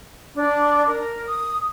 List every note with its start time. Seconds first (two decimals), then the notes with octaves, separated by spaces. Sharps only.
0.35 D4
0.87 A#4
1.26 D#6